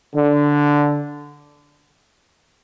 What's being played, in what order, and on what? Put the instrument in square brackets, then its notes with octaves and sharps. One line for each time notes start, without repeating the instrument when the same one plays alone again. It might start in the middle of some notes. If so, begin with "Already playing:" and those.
[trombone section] D3